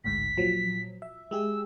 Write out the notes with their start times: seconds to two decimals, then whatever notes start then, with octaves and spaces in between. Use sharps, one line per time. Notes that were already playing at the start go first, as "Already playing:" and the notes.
0.04 A1 D2 G#2 B6
0.37 A#2 F3 F#3
1.02 E5
1.31 G#3 G4 G#4 E6